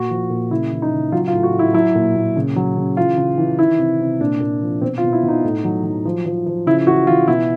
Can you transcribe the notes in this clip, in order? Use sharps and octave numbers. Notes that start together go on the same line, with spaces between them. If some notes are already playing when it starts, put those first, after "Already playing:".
Already playing: A#2 F#4
F3
A#2
C#3 E4
E3
D#4
C#3
F#3 F4
F4
A2
F#4
A2
E4
F#3 E4
A#2
A#2
C#3
F#3
C#3
E3 F4
C#3
E3
D#3 E4
C3
C3
A#2 D4
A#2
F3
B2 C4
F4
B2
E4
B2
D#4
A2
F#3
F#3
F3
F3
F3
C#3 E4
E3 F#4
E3 F4
B2 E4